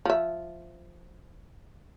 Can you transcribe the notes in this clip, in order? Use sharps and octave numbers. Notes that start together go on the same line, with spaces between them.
F3 E5